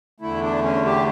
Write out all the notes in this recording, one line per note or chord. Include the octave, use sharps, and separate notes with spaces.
E2 D3 A3 E4
D4
C#4
G4